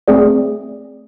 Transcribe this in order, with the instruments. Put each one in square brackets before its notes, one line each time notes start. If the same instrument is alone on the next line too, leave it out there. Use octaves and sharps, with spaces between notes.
[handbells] A3 C4 G#4 D5